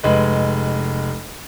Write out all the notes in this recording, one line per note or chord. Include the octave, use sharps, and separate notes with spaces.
F1 G#3 B4